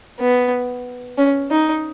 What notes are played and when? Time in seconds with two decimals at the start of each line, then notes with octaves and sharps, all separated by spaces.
0.20 B3
1.18 C#4
1.51 D#4